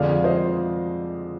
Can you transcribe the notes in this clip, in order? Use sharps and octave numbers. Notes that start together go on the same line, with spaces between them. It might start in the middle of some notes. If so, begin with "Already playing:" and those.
Already playing: F2 D3 F3 G#3 D5 F5
C5 D#5